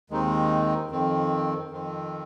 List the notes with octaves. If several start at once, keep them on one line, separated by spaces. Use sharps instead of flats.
D#2 D#3 G#3 C4 D#4
F2 D#3 C4
F2 D#3 C4